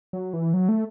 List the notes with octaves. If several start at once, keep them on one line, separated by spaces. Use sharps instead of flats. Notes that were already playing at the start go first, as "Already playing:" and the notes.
F#3
E3
F#3
A3